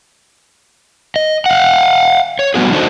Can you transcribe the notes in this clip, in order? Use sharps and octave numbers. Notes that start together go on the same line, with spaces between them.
D#5
F5 F#5
C#5
F#3 G3 B3 F#4 G#4
D4 D#4 F#4 A4 C5 D#5